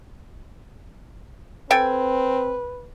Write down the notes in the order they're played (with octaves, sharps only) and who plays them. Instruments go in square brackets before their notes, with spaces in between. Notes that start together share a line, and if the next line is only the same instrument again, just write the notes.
[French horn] C4 [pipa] A4 G5 G#5 [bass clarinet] B4